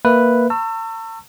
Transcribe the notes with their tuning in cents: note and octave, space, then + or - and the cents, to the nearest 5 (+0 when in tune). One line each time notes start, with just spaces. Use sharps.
A#3 +0 B4 +0 E5 +0
A5 +45 C#6 -10 E6 +25